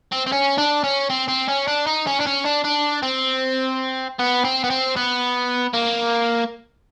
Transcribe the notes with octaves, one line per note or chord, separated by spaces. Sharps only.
C4
C4
C#4
D4
C#4
C4
C4
C#4
D4
D#4
C#4
D4
C#4
D4
D4
C4
B3
C4
B3
C4
B3
A#3